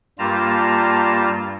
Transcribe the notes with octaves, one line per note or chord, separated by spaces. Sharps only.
G2 G3 A#3 F4 A5 A#5